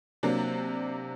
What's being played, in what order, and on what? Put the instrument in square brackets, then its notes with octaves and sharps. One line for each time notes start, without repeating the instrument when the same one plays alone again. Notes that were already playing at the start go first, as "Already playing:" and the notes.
[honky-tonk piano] C3 F#3 A#3 D4